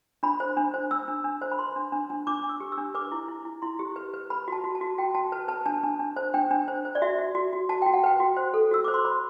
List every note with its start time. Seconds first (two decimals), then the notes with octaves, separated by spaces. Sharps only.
0.23 D4 B5
0.40 C5
0.57 D4
0.74 C5
0.91 D4 E6
1.08 D4
1.24 D4
1.41 C5
1.52 B5
1.59 B4 C6
1.76 D4
1.92 D4
2.10 D4
2.27 D4 D6
2.43 D4
2.49 E6
2.60 G4
2.72 E6
2.78 D4
2.95 B4 D6
3.12 E4
3.28 E4
3.45 E4
3.62 E4 C6
3.79 G4
3.96 B4
4.14 B4
4.30 B4 B5
4.48 F#4 A5
4.64 F#4
4.75 A5
4.81 F#4
4.98 F#4 G5
5.14 F#4 A5
5.32 B4 A5
5.48 B4 A5
5.66 D4 A5
5.83 D4
5.99 D4
6.16 C5
6.34 D4 G5
6.51 D4
6.68 C5
6.85 C5
6.95 D5
7.02 F#4 E5
7.19 F#4
7.35 F#4
7.53 F#4
7.69 F#4 A5
7.82 F#4 G5
7.94 F#5
8.04 B4 G5
8.20 F#4
8.37 C5
8.54 A4
8.71 F#4 E6
8.84 C5 D6
8.94 C6
9.04 C5 B5